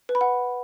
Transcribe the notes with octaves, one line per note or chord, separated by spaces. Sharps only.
B4
B5
F#5